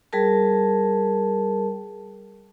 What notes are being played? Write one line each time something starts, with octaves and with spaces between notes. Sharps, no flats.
G3 G#4 A#4 A5